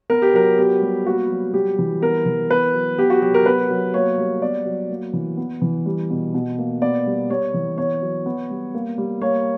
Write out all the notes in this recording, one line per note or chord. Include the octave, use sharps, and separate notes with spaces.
B3 A#4
G4
F#3 A#4
B3 G4
G3
A#3 F#4
F#3
G3 G4
E3
B3 A#4
E3
B3 B4
F#3
B3 G4
F#4
F#3 G4
A#4
B3 B4
F#3
A#3 C#5
G3
B3 D5
F#3
A#3
E3
B3
E3
G3
B2
B2
A#3
B3 D5
G3
G3 C#5
E3
B3 C#5
F#3
B3
G3
A#3
G3
A#3 C#5